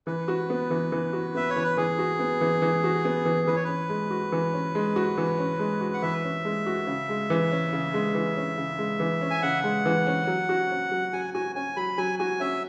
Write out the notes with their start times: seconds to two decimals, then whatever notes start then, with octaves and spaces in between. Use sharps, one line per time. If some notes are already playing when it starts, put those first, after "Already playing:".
0.07 E3 B4
0.28 F#4
0.50 B3
0.71 E3
0.92 E3
1.13 F#4
1.35 B3 E5
1.50 C#5
1.56 E3
1.64 B4
1.77 E3 G#4
1.99 F#4
2.20 B3
2.41 E3
2.62 E3
2.84 F#4
3.05 B3
3.25 E3
3.47 E3 B4
3.56 C#5
3.64 C#4 B4
3.89 G#3
4.11 F#4
4.32 E3
4.53 C#4
4.75 G#3
4.96 F#4
5.18 E3
5.39 C#4
5.59 G#3
5.81 F#4
5.94 F#5
6.02 E3 E5
6.24 C#4
6.45 G#3
6.66 F#4
6.87 C#3
7.09 G#3
7.30 E3
7.51 C#4
7.73 C#3
7.94 G#3
8.15 E3
8.36 C#4
8.58 C#3
8.79 G#3
9.00 E3
9.21 C#4
9.31 G#5
9.42 C#3 F#5
9.64 G#3
9.86 E3
10.07 C#4
10.27 F#3
10.49 F#4
10.71 C#4
10.92 F#3
11.13 F#3 G#5
11.34 F#4 G#5
11.56 C#4 G#5
11.77 F#3 B5
11.98 F#3 G#5
12.19 F#4 G#5
12.40 C#4 E5